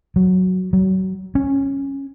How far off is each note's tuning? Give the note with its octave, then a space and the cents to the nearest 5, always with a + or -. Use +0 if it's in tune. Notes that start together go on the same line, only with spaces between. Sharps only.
F#3 +0
F#3 +30
C#4 -10